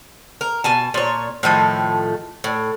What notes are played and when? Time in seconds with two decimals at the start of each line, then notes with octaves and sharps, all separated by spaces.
0.41 A#4
0.64 B2 G#5 A5
0.94 A#2 C#5
1.43 A2 D#3 F3 A3
2.44 A2